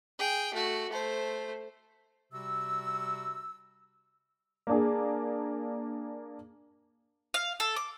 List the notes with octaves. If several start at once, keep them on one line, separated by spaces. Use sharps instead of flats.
G#4 G5
A3 F#4
A3 C5
C3 G3 F#4 E6
A#3 D4 G#4
F5
A4
D6